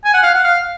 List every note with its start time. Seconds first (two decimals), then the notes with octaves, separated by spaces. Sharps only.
0.05 G#5
0.14 F#5
0.23 F5
0.35 F#5
0.44 F5